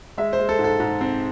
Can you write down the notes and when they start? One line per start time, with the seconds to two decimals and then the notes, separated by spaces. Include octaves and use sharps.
0.17 G#3 E5
0.33 C5
0.39 G#3
0.49 A4
0.59 G#2
0.64 A4
0.80 G#2
1.01 C4